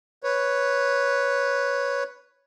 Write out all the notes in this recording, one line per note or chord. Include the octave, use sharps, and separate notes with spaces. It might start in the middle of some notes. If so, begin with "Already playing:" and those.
B4 C#5